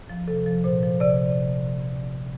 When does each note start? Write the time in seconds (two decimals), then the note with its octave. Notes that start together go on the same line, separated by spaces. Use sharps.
0.10 F3
0.27 C3 A4
0.46 F3
0.64 A#2 C5
0.83 F3
1.00 C3 D5